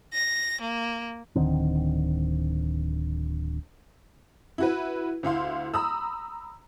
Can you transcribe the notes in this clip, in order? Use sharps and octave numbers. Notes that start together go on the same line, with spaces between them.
A#6
A#3
D1 D3 D#3 C4
E4 F#4 B4
D2 E4 F5 C6
A#5 B5 D#6 E6